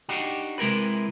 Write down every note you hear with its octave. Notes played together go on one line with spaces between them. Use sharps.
D4 D#4 F#4 G4
C3 G#3 E4 A#4 B4